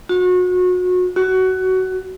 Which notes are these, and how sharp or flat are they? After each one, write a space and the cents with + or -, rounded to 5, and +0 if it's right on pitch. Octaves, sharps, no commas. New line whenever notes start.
F#4 -30
F#4 +20